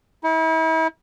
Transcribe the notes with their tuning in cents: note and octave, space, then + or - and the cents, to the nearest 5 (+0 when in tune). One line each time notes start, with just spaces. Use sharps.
E4 -40